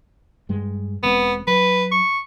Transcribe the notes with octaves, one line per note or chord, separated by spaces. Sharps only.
G2 G3 G#3
E1 G#3 B3 C4
F#3 B4
C#6